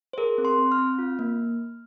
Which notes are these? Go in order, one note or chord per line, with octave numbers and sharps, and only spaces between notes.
C5
G#4 A#4
C4
C6
C4
F6
C4
F4
A#3